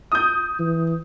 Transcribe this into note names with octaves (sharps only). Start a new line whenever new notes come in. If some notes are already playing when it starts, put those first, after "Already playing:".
D#6 G6
E3